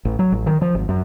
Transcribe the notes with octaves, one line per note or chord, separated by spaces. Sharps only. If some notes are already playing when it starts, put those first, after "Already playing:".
A1
F#3
A1
D#3
F3
G#1
F#2